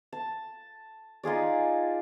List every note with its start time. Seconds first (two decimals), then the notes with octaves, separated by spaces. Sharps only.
0.13 A5
1.23 D#4 F4 G#4 D5